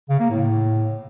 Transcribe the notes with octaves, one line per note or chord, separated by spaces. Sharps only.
C#3
A#3
A2